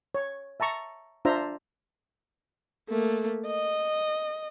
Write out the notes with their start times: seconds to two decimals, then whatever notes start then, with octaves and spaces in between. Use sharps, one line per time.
0.15 C#5
0.60 E5 A5 A#5 C#6
1.25 D4 F4 C5 E5 A#5
2.89 A3 A#3
3.47 D#5